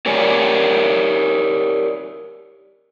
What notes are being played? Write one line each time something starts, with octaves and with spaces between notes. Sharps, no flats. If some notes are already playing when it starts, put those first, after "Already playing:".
G4 A#4 C#5 D5 G#5